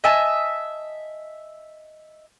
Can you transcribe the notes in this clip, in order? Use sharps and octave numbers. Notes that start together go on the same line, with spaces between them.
D#5 E5 G#5 A5